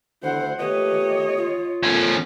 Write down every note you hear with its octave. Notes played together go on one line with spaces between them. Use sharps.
D2 E4 C5 F#5
A#2 A3 G4 B4 C#5 D#5
F4
A#2 C#3 F3 A3 B3 C#4